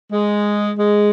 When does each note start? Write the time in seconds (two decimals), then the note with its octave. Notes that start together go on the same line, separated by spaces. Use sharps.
0.11 G#3
0.77 G#3